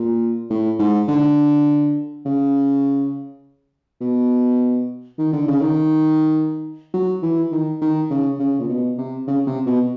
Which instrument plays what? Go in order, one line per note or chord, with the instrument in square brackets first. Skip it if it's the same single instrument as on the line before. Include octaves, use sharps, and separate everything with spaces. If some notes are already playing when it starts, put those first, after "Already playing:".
Already playing: [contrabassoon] A#2
A2
G#2
D3
C#3
B2
D#3
D3
C#3
D#3
F#3
E3
D#3
D#3
C#3
C#3
A#2
B2
C3
C#3
C3
B2